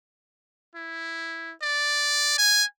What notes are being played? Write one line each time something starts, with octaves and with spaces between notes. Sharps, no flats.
E4
D5
G#5